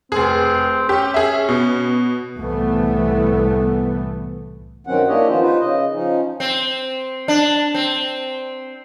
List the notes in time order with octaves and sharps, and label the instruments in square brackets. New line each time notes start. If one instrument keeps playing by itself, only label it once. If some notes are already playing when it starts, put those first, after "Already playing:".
[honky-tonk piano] F1 G#4 [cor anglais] C4
[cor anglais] C#4 [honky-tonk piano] G4
[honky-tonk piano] G#4 E5
B2
[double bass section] C2 A2 E3 A3 B3
[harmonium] G2 D#3 F#3 C4 C#4 F#5
A#3 D4 E4 G4 C#5 D#5
D#3 F3 B3 C#4 F4 C5
D#4 F4 B4 C5
C#3 D#5
F3 C#4 D#4
[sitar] C4
D4
C4